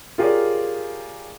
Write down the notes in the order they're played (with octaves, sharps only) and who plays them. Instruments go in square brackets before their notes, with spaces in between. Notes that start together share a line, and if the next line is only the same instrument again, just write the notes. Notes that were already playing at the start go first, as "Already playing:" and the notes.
[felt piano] F4 G4 G#4 A#4 C#5 D5